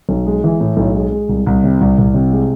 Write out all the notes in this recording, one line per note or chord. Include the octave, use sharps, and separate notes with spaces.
B1
G#3
E3
A2
B1
G#3
G#3
C2
C2
C3
C2
C2
C3
G#3